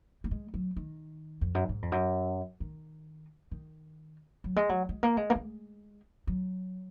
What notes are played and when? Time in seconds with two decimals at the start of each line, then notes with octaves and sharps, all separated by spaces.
0.24 A#3
0.31 G#3
0.54 F#3
0.76 D#3
1.41 F2
1.55 F#2
1.69 G#2
1.82 F2
1.92 F#2
2.60 D#3
3.51 D#3
4.44 F#3
4.56 G#3
4.69 F#3
4.89 G#3
5.03 A#3
5.17 G#3
5.30 A#3
5.35 G#3
6.27 F#3